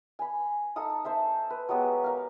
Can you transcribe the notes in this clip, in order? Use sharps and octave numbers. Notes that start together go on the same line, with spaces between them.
G#5 B5
D#4 A4 F5 D#6
C5 E5 A5
B4
F#3 G#3 B3 G4
A#4 F5